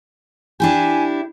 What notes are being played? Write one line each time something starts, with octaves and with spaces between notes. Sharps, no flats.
D4 E4 G4 G#5